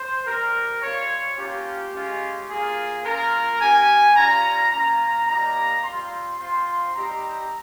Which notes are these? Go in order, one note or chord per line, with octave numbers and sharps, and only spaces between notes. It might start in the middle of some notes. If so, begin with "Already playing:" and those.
Already playing: C5
G3 C4 G4 A#4
G3 C4 F4 C#5
A#3 C#4 F4 G4
G#3 C#4 F4
A#3 F4 G#4
A#3 C#4 F4 A#4
A#3 C#4 G4 G#5
G3 C#4 F4 A#5
A#3 C#4 F4 A#5
G3 A#3 D#4 G4 A#5
G3 C4 F4 C6
C4 F4 C6
G3 C4 D#4 G4 A#5